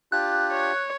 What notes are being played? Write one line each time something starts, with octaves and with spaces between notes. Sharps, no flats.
D4 F4 G4 F#6
C#5